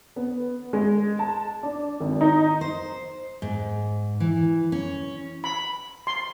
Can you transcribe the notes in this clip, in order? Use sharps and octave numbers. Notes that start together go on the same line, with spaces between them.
B3
G#3
A5
D4
G#1
D#4
C5
G#2
E3
C#4
B5
C6